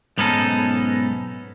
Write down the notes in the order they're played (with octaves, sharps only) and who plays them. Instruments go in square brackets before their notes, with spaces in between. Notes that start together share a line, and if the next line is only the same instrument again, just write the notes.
[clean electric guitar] B1 G#2 B3 C#4 D#4 A4